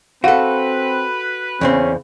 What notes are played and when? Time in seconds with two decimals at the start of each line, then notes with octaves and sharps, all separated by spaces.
0.24 C4 F#4 A4 B4 F5 F#5
1.61 E2 C#3 C4 C#4